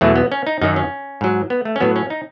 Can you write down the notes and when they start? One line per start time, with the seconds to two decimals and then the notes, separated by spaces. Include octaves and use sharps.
0.01 E2 B2 F#3 A3
0.16 B3
0.32 C#4
0.47 D#4
0.62 F#2 D#3 F#3 D#4
0.76 C#4
1.21 G#2 F#3
1.50 B3
1.65 A3
1.76 C#4
1.80 A2 F#3 B3
1.96 C#4
2.10 D#4